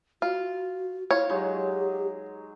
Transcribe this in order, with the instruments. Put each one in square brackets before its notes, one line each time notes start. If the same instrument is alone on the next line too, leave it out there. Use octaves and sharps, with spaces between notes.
[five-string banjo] F4 [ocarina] F#4
[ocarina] E4 [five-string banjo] F4 C#5
[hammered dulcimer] F#3 G#3 D#4 [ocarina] G4